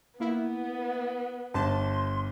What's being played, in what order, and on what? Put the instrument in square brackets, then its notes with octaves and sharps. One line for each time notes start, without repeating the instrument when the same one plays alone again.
[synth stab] A#3 E4 [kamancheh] B3
[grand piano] G1 [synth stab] A5 [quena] C6